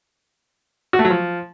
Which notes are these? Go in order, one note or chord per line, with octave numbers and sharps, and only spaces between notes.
F#4
A3
F#3
F3